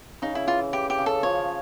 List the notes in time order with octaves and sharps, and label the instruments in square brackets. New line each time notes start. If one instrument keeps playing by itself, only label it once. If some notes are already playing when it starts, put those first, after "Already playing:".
[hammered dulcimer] C#3 [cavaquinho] D#4
[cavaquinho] E4
[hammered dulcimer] E3 [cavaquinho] F4
[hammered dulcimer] E3 [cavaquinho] G4
[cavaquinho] G4
[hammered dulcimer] C#3
[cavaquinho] A4
[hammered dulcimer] F3 [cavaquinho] C#5